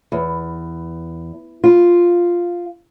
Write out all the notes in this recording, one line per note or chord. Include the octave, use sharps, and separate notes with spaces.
E2
F4